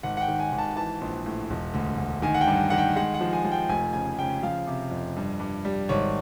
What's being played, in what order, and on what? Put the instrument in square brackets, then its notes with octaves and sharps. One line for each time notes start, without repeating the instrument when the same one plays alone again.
[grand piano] G#1 F#5
F#5
G5
D#3
G#5
G#1
A5
E3 A5
A#1
A2
E1
D2
D2
D#3 G#5
F#5
G5
G2
D#3 F#5
G5
G#3 F#5
F#5
F3
G#5
F3
G5
F1 G#5
C#3 G#5
C#3 G5
F3 F5
C3
F2
G2
G2
G3
G#1 C#5